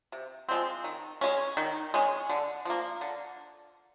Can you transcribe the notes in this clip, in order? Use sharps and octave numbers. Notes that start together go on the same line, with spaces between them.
C3
F3 G#3 C4
D#3
G#3 C#4
D#3
G#3 C#4
D3
F3 A#3
D3